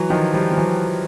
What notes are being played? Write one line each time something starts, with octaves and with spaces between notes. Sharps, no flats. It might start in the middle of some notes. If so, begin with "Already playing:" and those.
Already playing: E3 F#3
D#3 F3
F3 G3
F3
E3 F#3